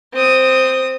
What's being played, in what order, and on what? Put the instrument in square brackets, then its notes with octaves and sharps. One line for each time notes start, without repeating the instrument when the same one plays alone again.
[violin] C4 D#6